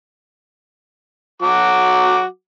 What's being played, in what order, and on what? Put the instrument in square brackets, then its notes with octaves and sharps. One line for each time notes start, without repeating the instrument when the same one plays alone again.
[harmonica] F#3 F#4 D6